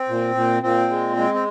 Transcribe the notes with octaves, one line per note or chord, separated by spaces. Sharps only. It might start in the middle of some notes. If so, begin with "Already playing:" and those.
Already playing: C4
A#2
A#2
A#2 C4
G#3
G#3
C4